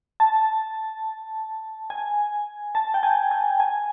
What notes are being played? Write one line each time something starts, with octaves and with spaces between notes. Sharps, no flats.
A5
G#5
A5
G5
G#5
G#5
G#5